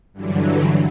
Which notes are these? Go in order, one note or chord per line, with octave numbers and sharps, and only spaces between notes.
G2 D3 E3 F#3